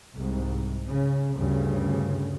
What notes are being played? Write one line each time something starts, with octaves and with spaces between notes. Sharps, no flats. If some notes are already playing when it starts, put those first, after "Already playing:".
C2 G#2
C#3
D2 G2 C#3